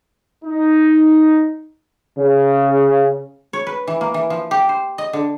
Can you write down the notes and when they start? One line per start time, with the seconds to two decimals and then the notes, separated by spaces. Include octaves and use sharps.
0.45 D#4
2.17 C#3
3.53 C#5
3.67 B4
3.87 E3
4.01 A#3
4.14 E3
4.30 F3
4.51 G4
4.69 C5
4.98 D#5
5.13 D3